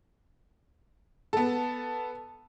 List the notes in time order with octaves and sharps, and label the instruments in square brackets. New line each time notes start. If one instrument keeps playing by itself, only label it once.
[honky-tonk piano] B3 A4